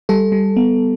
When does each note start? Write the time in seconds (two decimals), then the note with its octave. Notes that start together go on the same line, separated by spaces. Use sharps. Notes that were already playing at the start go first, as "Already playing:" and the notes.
0.09 G3 A4
0.32 G3
0.57 B3